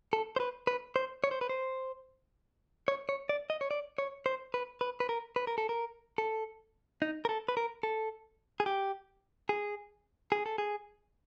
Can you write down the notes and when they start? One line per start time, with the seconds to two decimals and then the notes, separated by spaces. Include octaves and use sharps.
0.13 A4
0.36 C5
0.40 B4
0.67 B4
0.96 C5
1.24 C#5
1.31 C5
1.41 B4
1.49 C5
2.88 C#5
3.09 C#5
3.29 D5
3.50 D#5
3.61 C#5
3.71 D5
3.98 C#5
4.26 C5
4.54 B4
4.81 B4
5.00 B4
5.09 A#4
5.36 B4
5.47 A#4
5.58 A4
5.69 A#4
6.18 A4
7.02 D#4
7.25 A#4
7.29 A4
7.49 B4
7.57 A#4
7.83 A4
8.60 G#4
8.66 G4
9.49 G#4
10.32 G#4
10.46 A4
10.58 G#4